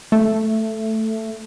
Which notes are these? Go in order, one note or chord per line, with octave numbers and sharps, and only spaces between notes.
A3